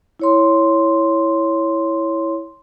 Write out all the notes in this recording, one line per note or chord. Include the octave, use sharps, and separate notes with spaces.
E4 C#5 C6